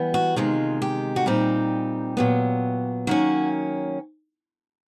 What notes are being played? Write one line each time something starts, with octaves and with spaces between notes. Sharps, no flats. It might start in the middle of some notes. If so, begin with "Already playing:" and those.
Already playing: E3 G3 B3
F#4
C3 D#3 G#3 F4
G4
F#4
A#2 G3 C4 D#4 G4
A#2 F#3 B3
D#3 F#3 A#3 C#4 F#4